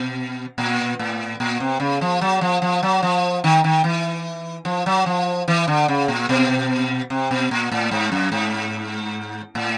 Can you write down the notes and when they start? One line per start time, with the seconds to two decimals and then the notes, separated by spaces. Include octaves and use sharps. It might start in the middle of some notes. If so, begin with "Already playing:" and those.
Already playing: B2
0.58 A#2
0.99 A2
1.40 A#2
1.60 C3
1.80 C#3
2.01 F3
2.21 F#3
2.41 F3
2.62 F3
2.83 F#3
3.03 F3
3.44 D#3
3.64 D#3
3.84 E3
4.65 F3
4.86 F#3
5.06 F3
5.48 E3
5.68 D3
5.88 C#3
6.08 A#2
6.29 B2
7.10 C3
7.31 B2
7.51 A#2
7.72 A2
7.91 G#2
8.12 F#2
8.32 G#2
9.55 A2